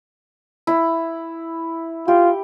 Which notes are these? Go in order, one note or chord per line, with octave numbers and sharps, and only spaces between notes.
E4
F4 G4